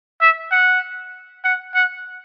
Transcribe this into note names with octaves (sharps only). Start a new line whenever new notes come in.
E5
F#5
F#5
F#5